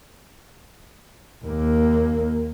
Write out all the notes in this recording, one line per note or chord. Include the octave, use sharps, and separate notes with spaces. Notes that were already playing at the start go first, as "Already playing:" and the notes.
D#2 A#3